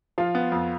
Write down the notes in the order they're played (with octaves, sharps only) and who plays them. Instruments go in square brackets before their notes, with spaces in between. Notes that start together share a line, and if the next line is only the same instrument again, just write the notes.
[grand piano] F3 [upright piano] F4 F5
[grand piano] B3
F2